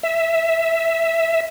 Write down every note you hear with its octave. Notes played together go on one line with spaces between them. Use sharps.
E5